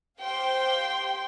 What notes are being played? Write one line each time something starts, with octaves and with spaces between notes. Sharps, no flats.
G4 C5 F5 G5 C6